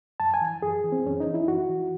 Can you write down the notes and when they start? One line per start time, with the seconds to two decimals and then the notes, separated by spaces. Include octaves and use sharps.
0.20 F#2 A5
0.34 G#5
0.41 E3
0.62 F#2 G#4
0.84 E3
0.92 C4
1.06 F#2 C#4
1.20 D#4
1.26 E3
1.34 E4
1.47 F#2 F#4
1.69 E3